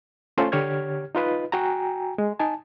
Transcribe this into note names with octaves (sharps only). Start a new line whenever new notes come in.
A3 C#4 F4 A4 C5
D3 G4 C#5 F6 G#6
D#4 F4 B4 D#5
F#4 G5 G#5 A#5
G#3
D#4 G#5 A5